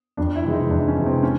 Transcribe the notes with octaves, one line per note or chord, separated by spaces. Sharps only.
F2 D4
E4
C3 E3 G#3
D#4
F2 D4
C#4
C3 E3 G#3
C4
C#4